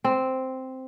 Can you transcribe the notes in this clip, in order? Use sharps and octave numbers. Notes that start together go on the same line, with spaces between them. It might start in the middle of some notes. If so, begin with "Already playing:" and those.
C4